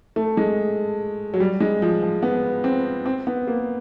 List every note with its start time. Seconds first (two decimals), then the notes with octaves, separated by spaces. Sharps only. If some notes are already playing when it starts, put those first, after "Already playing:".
0.16 A3
0.37 G#3
1.34 F#3
1.40 G3
1.60 G#3
1.82 F3
2.02 F3
2.23 B3
2.64 C4
3.06 C4
3.27 B3
3.47 A#3